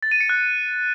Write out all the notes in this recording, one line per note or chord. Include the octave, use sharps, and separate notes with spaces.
A6
D#7
C#7
F#6